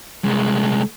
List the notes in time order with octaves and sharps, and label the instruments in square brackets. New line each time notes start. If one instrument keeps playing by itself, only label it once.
[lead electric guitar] C2 G#3